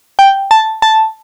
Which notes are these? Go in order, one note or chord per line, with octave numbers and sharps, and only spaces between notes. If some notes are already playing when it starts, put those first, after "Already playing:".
G5
A5
A5